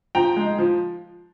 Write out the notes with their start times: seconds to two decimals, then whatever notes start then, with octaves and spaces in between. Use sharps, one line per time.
0.15 F3 G5 A#5
0.36 G#3 D#4
0.58 F3